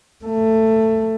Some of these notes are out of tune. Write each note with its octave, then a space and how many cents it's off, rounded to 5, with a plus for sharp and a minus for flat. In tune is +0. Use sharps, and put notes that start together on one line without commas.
A3 +15